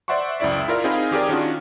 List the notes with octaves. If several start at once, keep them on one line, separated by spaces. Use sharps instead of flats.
C5 D5 E5 F#5 C6 C#6
C#2 F#2 E4 D5 E5
E4 F4 A#4 D5 F5
C4 D#4 G#4 D#5 F5 B5
D#3 G4 G#4 A#4 D5
D#3 C#4 D4 F4 F#4